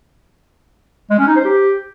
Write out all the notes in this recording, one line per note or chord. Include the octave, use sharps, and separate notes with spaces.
G#3
C#4
D#4
C5
G4